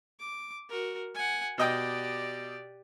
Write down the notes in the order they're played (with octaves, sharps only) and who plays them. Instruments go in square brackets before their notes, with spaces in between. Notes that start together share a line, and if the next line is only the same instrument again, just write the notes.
[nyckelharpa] D6
F#4 A#4
F#5 G#5
[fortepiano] B2 D#5 G5 [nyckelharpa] G4 D5